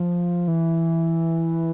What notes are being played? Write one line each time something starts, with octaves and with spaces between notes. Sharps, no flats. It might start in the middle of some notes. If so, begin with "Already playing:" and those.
Already playing: F3
E3